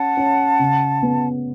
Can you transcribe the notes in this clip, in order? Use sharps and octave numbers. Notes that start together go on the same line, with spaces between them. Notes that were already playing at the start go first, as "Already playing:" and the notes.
Already playing: C#4 F#5 A5
C#4
C#3
B3